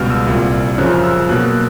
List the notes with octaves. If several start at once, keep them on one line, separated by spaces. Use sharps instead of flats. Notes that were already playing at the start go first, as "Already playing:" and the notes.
Already playing: C#2 B2 G3 F6
E6
C2 A#2 G3
F#2 C#3 F3 F#6
F6
E6
B2 F#3 A#3 F#6
F#6